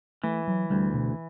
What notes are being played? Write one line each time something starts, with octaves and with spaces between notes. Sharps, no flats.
E3 A3
F#3
D2 G3
B2